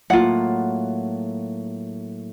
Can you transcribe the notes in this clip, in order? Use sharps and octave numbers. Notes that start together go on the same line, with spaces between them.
A2 F#3 A#3 F4 F#5